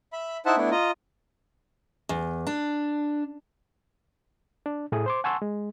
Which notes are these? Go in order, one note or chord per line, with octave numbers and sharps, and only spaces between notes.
E5 B5
D#4 E4 C5 E5 F#5 A5
A3 B3 D4 E4
F4 D#5 A#5
E2
D4
D4
A2 A3 G#4 D#6
C5 C6 D6
F#5 G#5 A5 C6 C#6 E6
G#3